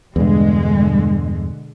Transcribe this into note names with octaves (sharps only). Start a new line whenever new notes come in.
E2 G2 B2 D3 G#3